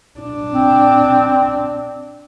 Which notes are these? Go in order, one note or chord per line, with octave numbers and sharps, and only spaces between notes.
D4
C4